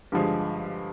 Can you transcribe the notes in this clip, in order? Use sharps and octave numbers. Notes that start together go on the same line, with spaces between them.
G2 D3 F3 G#3